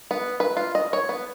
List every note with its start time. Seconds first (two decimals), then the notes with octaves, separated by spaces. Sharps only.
0.11 B3
0.40 B4
0.57 F4
0.75 D#5
0.93 C#5
1.09 B3